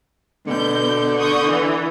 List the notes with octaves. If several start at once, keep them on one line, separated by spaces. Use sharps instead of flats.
B2 D3 B3 G6
C#6 D#6 G6
E3